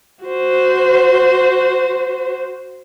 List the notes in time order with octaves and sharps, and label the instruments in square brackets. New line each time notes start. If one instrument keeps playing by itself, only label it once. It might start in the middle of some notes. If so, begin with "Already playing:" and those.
[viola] F#4 C5